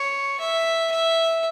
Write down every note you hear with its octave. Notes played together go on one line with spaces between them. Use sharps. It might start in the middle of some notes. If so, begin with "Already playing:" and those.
Already playing: C#5
E5
E5